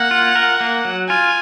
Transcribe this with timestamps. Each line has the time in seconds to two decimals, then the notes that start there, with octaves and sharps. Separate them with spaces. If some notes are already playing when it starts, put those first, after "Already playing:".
Already playing: A#3 F#5
0.11 F4
0.36 A#4
0.61 A#3
0.85 F#3
1.09 F4 G#5